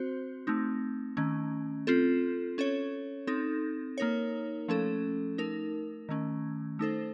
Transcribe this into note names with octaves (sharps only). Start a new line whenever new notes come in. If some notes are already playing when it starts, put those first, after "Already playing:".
Already playing: C4 F#4 C5
A3 C4 D#4
D#3 A3 C#4
C4 F4 A4
C#4 A4 C#5
C4 D#4 A4
A#3 D#4 A#4 C#5
F3 A3 C#4 A4
A3 D#4 A#4
D#3 A3 C#4
A3 D#4 A4 C5